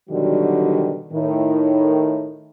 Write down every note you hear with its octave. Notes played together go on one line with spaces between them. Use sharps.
B2 D3 D#3 F#3 G3 F#4
A2 D#3